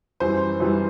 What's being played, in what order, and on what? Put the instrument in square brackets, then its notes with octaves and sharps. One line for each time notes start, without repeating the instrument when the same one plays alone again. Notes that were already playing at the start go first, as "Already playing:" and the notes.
[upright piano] F#2 E3 G3 C5
F#2 E3 G3